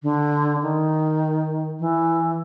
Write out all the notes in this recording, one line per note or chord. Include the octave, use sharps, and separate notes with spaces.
D3
D#3
E3